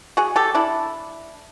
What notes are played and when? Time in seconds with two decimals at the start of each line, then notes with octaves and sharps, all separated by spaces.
0.17 F#4 G#4
0.36 G4 A4
0.55 D4 E4